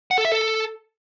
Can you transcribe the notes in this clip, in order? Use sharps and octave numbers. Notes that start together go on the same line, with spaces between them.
F#5
A4
E5
A4